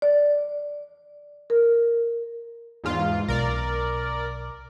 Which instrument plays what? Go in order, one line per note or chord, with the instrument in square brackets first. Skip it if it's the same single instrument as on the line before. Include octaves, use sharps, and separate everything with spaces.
[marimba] D5
A#4
[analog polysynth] E2 G#2 F4
[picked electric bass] B1 [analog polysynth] A#4 D5